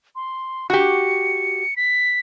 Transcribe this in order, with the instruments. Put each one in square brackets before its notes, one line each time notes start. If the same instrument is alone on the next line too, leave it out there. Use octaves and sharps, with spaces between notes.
[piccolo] C6
[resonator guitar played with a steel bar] F#4 G4 [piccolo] C#7
[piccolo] B6